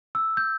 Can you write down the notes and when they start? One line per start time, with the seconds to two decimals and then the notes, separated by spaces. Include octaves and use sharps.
0.15 E6
0.37 G6